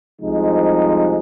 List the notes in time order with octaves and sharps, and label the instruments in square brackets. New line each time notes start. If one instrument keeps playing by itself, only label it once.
[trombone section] C2 C3 F3 G#3 D#4